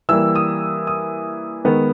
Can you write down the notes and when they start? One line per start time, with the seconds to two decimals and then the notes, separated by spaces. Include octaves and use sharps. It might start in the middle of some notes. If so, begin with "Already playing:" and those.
0.09 E3 G3 A#3 E6
0.36 D#6
0.87 D#6
1.65 D#3 G#3 B3